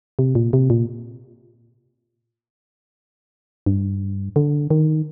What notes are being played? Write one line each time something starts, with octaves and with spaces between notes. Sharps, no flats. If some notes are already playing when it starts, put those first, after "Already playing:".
C3
A#2
C3
A#2
G2
D3
D#3